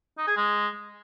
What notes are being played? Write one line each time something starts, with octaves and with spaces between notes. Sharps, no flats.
D#4
G#4
G#3